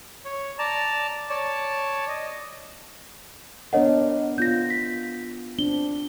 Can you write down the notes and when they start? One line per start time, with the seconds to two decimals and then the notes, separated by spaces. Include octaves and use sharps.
0.25 C#5
0.59 D5 A5 A#5
1.29 C#5 D5 A5
2.09 D#5
3.73 B3 D4 A#4 C#5 D#5 F#5
4.38 B3 F4 G6 A#6
4.70 B6
5.59 C4 D4 G7